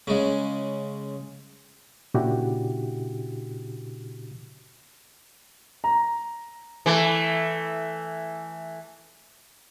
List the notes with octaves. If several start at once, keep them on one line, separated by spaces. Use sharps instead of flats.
C#3 G#3
A#2 C#3 D4 E4 F#4 G4
A#5
E3 A3